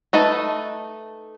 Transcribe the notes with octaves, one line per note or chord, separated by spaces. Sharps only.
A3 D#4 B4 A5